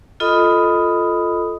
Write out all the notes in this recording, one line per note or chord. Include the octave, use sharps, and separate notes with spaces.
F4 A4 D#5 B5 D#6